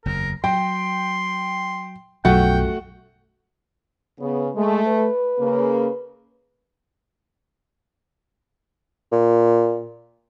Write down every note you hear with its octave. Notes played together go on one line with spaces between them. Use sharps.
F#1 E2 A#4
F#3 G5 C6
B1 F#2 F3 A3 F#4 F#5 G5
C#3 B3
G#3 A3
B4
C#3 A#3
A#2